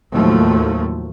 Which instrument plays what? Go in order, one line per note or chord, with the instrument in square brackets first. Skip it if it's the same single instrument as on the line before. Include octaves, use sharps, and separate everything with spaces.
[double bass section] D#2 A2 F3 F#3 A3